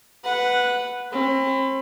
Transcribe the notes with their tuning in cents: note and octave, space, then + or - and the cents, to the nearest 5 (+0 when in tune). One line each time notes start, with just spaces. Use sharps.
B4 +0 F#5 -10
C4 +40 B5 +30